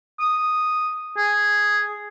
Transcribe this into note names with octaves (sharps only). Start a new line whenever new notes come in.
D#6
G#4